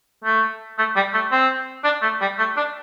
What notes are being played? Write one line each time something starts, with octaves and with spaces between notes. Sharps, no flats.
A3
A3
G3
A3
C4
D4
A3
G3
A3
D4